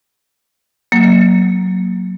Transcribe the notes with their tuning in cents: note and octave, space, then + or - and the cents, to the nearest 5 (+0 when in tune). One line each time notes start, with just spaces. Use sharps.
F#3 +0 A#3 +0